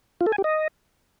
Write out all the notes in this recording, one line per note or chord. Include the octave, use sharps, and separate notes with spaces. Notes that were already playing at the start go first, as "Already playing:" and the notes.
F4
A4
G#5
G4
D#5